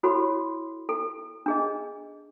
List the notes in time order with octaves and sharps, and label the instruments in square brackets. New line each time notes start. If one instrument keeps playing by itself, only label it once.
[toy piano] E4 F#4 A4 C#5 B5 C6
A4
D4 G#4 D#5